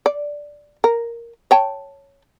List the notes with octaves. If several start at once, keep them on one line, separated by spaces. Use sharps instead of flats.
D5
A#4
C#5 G5 A5